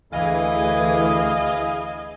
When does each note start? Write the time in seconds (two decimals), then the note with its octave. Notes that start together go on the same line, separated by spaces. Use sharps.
0.13 D2 E3 E4 G#4 D#5 F5 G#5